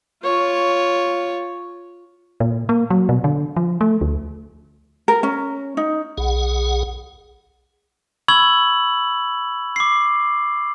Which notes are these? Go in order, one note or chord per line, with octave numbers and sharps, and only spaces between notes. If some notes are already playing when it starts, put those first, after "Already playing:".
F4 C#5
A#2
A#3
F#3
B2
D3
F3
A3
D2
A#4
C#4
D#4
B1 G#4 F#5
B5 C#6 E6 G#6 F#7
D6 C7